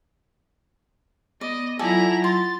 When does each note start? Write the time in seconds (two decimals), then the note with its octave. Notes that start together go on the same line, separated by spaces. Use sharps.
1.41 B3 D5 D#5
1.79 F#3 E4 F4 A4 D5 F#5 G#5 A#5
2.24 C6 A6